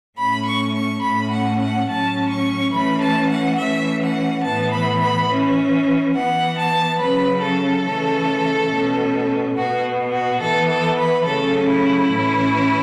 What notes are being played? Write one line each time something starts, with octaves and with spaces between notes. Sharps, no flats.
A2 A3 C#4 B5
C#6
C#6
A2 A3 C#4 B5
F#5
F#5
A2 F#3 C#4 A5
C#6
E3 A3 C#4 B5
A5
F#5
E3 A3 C#4 E5
F#5
A2 E3 B3 A5
B5
B5
E3 C#4
E3 B3 F#5
A5
C#3 F#3 C#4 B4
A4
C#3 E3 A3 C#4
B2 A3 C#4
B2 B3 F#4
F#4
E3 B3 A4
A4
B4
C#3 F#3 A3 C#4 A4
E4
A2 E3 C#4